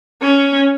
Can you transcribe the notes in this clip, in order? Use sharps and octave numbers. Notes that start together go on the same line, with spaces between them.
C#4